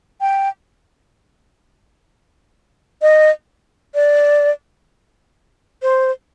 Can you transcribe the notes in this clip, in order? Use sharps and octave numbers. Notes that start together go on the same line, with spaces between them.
G5
D#5
D5
C5